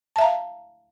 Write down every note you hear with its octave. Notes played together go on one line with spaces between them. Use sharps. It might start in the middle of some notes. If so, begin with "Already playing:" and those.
E5 F5 A5 A#5